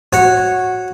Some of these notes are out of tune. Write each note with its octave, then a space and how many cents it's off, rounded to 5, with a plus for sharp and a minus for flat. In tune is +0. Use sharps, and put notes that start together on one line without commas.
F#4 -5 C#5 -10